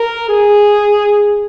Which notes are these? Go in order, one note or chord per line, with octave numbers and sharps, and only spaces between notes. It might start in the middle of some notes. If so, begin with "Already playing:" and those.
Already playing: A#4
G#4